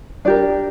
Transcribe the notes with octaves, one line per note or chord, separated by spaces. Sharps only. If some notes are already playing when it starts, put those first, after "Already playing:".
D4 G4 A#4 D5